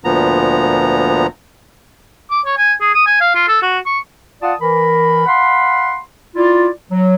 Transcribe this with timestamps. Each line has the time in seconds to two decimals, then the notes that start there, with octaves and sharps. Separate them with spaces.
0.04 D2 A#2 F3 B3 A#5
2.31 D6
2.46 C#5
2.57 G#5
2.81 G#4
2.94 D#6
3.06 G#5
3.21 F5
3.35 F4
3.48 A4
3.62 F#4
3.86 C#6
4.42 F4 D5 F5 F#5 A5 D#6
4.61 E3 A#4 B5
5.27 F5 F#5 B5 C6
6.36 E4 F4 D5
6.90 F#3